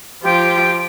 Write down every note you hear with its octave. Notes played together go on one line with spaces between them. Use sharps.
F3 F4 G4 G5